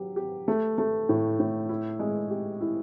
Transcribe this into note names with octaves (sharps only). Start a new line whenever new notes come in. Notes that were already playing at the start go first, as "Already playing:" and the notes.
Already playing: F#3 G4
G4
A3
A3
A2
A2
E4
G#3
G4
E4